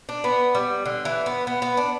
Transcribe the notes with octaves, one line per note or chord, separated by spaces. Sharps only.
D4
B3
G3
D3
E3
B3
B3
B3
D4